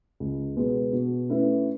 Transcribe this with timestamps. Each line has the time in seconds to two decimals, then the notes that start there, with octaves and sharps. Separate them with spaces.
0.20 C#2
0.56 B2 G#3 B3
0.93 B2
1.29 A3 C#4 E4 B4